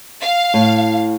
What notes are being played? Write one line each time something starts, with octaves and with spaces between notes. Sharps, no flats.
F5
A2